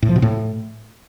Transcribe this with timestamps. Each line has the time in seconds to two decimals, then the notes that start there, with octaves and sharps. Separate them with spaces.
0.02 A2
0.09 F3
0.16 B2
0.22 A2